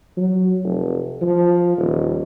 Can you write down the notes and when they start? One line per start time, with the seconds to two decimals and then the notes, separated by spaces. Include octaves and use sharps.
0.17 F#3
0.63 F1
1.22 F3
1.78 D#1